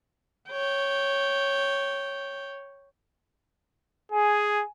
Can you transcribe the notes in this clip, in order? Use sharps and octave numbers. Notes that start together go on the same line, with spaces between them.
C#5 G5
G#4 G#5